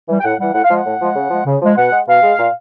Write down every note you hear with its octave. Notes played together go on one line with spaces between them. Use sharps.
E3 G3
G5
A2 F#5
E3 G3 F#5
A2 F#5
F5
F3 G#3 F#5
A2
F3 G#3
C#3
F3 G#3
C#3
F3 G#3
B2 F#5
G#3
B2 F5
G#3
A#2